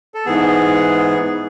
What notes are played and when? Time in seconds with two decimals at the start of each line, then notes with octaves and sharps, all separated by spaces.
0.14 A4
0.26 G#2 E3 B3 G#4